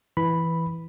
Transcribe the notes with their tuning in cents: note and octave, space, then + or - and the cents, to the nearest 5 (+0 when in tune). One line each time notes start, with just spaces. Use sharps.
E3 +0 B5 +0